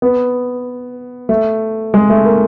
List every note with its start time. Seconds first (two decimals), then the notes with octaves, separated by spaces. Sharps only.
0.02 B3
1.29 A3
1.94 G#3
2.10 A3
2.25 A#3